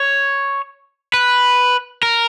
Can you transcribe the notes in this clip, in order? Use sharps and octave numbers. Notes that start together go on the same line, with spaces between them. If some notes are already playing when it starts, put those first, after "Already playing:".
Already playing: C#5
B4
A#4